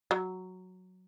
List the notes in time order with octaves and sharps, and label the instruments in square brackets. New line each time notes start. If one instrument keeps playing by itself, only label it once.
[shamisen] F#3